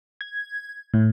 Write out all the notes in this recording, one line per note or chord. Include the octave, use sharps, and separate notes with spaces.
G#6
A2